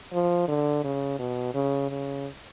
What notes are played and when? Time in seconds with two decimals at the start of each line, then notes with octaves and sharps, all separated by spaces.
0.13 F3
0.48 D3
0.84 C#3
1.19 B2
1.54 C#3
1.90 C#3